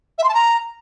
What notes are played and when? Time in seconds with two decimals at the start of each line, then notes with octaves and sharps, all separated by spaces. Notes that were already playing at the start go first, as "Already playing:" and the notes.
0.18 E5
0.24 C6
0.29 A5
0.34 A#5